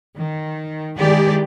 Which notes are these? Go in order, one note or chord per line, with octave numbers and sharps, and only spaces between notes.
D#3
D#3 G#3 E4 G4 G#4 D5